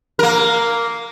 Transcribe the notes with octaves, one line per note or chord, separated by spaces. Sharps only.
A#3 A#4